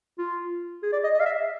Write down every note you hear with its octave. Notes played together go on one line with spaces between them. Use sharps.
F4
G#4
D5
D#5
D#5
F5
E5